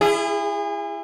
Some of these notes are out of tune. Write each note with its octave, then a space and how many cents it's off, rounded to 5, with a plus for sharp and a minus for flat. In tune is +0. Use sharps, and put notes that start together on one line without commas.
E4 +25 G#4 -30